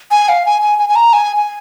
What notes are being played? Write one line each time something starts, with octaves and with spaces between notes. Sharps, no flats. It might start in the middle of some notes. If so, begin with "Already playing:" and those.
G#5
F5
G#5
G#5
G#5
G#5
A#5
G#5
G#5